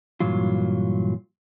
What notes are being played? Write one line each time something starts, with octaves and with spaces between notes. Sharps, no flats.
G2 A#2 E3 F#3 F4